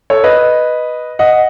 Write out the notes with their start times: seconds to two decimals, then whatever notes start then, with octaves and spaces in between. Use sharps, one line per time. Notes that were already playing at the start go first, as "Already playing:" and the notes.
0.10 A4 C#5
0.24 B4 D#5
1.19 D#5 F#5